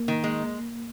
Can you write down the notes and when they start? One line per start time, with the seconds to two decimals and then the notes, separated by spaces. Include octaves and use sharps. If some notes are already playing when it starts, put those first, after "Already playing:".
Already playing: A#3
0.08 D#3
0.24 G#3